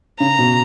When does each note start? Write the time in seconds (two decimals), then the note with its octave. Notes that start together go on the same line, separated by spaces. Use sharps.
0.20 C#3 A#5
0.38 B2